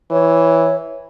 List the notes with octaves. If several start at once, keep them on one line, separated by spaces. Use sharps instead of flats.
E3 C#5